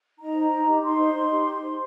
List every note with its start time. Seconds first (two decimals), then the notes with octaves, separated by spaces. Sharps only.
0.18 D#4 A#5
0.34 C5
0.51 D#4
0.67 G4
0.83 D#4 C6
0.98 C5
1.15 D#4
1.31 G4
1.46 D#4
1.63 C5